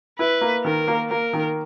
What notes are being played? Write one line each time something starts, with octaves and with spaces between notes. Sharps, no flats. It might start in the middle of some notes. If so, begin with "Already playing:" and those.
E4 B4
A#3
D#3 A#4
A#3
A#3 A#4
D#3